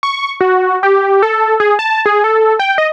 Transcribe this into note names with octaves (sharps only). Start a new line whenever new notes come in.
C#6
F#4
G4
A4
G#4
A5
G#4
A4
G5
D#5